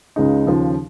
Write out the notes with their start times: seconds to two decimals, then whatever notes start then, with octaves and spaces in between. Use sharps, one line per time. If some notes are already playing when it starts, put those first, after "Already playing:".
0.16 C#2 C#3 G#3 D#4
0.47 D#2 C#3 F3